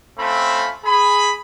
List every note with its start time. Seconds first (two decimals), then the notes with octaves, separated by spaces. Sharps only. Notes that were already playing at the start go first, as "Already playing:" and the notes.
0.19 A3 C4 C#4 F4 B5
0.85 G#4 B5